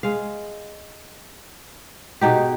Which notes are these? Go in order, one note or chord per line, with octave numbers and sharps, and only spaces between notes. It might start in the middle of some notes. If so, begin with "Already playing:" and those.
G#3 F5
G#2 B2 D#4 G4